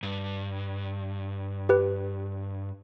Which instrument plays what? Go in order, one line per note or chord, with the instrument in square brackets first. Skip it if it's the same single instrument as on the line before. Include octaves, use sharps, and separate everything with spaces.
[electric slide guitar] G2
[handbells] G4 B4